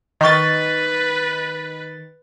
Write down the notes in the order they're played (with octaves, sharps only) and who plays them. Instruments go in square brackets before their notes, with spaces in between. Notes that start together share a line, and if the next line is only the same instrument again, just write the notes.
[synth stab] D#3 A6 [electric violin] B4 [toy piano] D#5 C#6